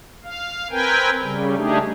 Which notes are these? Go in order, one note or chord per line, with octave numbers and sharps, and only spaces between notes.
F5
C4 A#4 B4 G5 G#5
C#3 G3
G3 A3 D4 D#4 G4 G#4